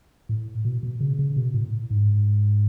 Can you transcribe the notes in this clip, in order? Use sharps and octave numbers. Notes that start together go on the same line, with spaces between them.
A2
B2
B2
C#3
C#3
B2
A2
G#2